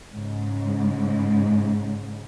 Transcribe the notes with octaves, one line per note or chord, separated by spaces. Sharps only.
G#2 C#3